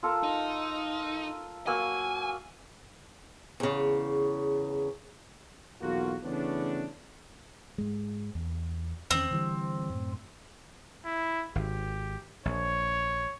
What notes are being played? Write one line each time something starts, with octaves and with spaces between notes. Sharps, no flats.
F4 A4 A#4
D#4
F#3 A#3 G#5 E6
E2 C#3
B1 E2 A#3 F4 F#4
C#3 E3 A3 B3 C#4 D4
G#2 G#3
E2
E2 D#3 C4 C#4
D3 E3 G3
F#2 A2
E4
G#1 G4
A#1 C#5